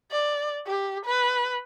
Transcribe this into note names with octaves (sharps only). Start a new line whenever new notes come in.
D5
G4
B4